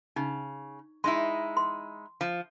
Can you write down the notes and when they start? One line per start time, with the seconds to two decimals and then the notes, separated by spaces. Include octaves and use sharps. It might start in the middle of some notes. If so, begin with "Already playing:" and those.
0.16 C#3 D#4
1.04 G#3 D#4 E4 C6
1.57 C6
2.21 F3